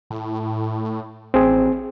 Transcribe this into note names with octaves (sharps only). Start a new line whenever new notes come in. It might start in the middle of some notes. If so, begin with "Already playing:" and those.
A2
A1 C4 G#4